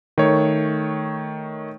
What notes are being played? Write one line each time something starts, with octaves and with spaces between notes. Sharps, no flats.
D#3 A3 C#5